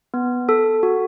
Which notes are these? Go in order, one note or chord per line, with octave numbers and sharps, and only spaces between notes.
B3
A4
F#4